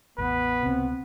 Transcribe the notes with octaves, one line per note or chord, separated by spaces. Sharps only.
A1 E2 E3 B3 B4
C#2 C3 C4